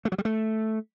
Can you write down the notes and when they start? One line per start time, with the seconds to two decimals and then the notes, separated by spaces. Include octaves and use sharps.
0.05 A3
0.12 F#3
0.18 G3
0.25 A3